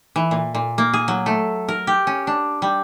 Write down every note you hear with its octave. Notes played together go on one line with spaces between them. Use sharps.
E3
A#2
A#2
A#3
G#4
F#3
A3
A#4
G4
C#4
D4
G3